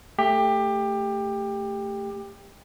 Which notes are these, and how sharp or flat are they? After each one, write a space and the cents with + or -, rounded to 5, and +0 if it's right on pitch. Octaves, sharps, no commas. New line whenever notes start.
A3 +10 G4 +20